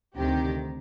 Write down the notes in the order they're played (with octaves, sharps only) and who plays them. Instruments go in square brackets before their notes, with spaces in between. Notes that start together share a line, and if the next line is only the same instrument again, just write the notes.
[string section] D2 C3 D#3 G4